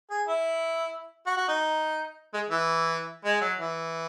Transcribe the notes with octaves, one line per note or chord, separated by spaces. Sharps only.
G#4
E4
F#4
F#4
D#4
G#3
E3
G#3
F#3
E3